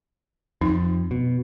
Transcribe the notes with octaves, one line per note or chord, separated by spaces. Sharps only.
F2 D#4 C6
B2